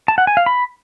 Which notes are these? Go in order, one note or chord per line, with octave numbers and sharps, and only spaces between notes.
A5
F#5
G#5
F5
B5